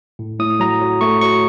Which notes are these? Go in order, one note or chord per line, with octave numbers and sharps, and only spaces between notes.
A2
A2 D#6
F#3 A#5
F#3
A3 C#6
F#3 C#6